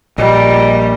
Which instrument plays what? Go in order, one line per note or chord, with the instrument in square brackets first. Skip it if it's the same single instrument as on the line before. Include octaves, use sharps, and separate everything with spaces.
[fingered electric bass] A#1 [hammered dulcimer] A#2 [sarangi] G3 [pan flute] D#5